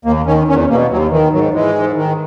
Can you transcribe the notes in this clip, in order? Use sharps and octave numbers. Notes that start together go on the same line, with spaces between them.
D#2 A#3
D#3 C#4
E2 C#4
B2 A#3
D#2 F#3
D#3 E3
G#2 F#3
E3 G#3
G#2
D#3